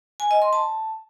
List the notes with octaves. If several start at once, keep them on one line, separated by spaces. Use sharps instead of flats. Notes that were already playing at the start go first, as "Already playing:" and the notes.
G#5
D#5
C6
A5